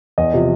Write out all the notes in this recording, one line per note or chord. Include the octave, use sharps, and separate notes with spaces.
E2 D#5
C3 F3